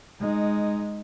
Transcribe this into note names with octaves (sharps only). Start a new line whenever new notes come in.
G#3 D#4